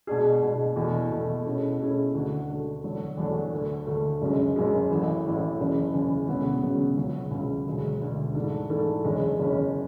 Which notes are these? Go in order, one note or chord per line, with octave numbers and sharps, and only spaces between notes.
B2 G#3 D4 G#4
B2 G#3 D4 G#4
E2 B2 A3 E4
E2 B2 A3 E4
B2 A3 C#4 E4 G#4
B2 A3 C#4 E4 G#4
D2 D3 A3 D4 F#4
D2 D3 A3 D4 F#4
E2 D3 F#3 A3 D4
E2 D3 F#3 A3 D4
D2 D3 A3
D2 D3 A3
F#1 F#2 C#3 G#3
F#1 F#2 C#3 G#3
A1 A2 E3
A1 A2 E3
F#1 E2 C#3 E3
F#1 E2 C#3 E3
E1 D2 C#3 F#3 B3
E1 D2 C#3 F#3 B3
C#2 C#3 F#3
C#2 C#3 F#3
E1 D2 D3
E1 D2 D3
G#2 E3 A3 D4 A4
G#2 E3 A3 D4 A4
F#1 E2 D3 G#3 C#4
F#1 E2 D3 G#3 C#4